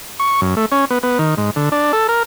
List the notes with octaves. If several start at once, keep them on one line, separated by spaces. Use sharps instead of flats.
C#6
F#2
A3
C#4
B3
B3
D#3
G#2
D3
D4
A4
A#4